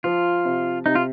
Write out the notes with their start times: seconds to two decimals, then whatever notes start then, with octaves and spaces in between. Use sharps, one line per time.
0.04 F3 F4
0.45 C3
0.86 C3 D#4
0.95 F4